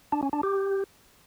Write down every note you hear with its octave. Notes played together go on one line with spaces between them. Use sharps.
D4
C#4
D4
G4